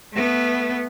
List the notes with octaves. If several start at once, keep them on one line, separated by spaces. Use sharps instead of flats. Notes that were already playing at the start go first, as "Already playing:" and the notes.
A3 B3